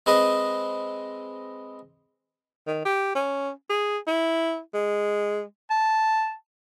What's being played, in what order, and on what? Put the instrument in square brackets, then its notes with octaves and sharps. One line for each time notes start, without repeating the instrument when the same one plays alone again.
[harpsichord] G#3 C4 B4 D#5
[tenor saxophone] D#3
G4
C#4
G#4
E4
G#3
[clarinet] A5